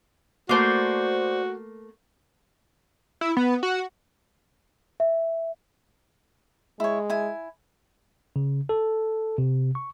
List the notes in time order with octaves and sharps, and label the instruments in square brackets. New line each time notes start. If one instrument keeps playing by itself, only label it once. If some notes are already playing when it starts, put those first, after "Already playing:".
[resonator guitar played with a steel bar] A3 A#3 [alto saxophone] F#4 [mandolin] C5 D5
[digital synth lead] E4
B3
F#4
[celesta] E5
[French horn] G#3 [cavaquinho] E4 C#5
[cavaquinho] E4 G#5
[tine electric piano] C#3
A4
C3
C#6